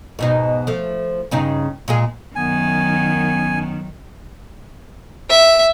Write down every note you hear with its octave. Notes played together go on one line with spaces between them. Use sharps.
G#2 B2 D#4
F3 A3
G2 C#3 D#4
A#2 G#3 G#4
F#2 D#3 F#3 B3 G#5
E5